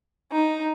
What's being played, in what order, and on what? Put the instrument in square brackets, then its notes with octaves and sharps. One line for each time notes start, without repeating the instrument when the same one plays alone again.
[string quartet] D#4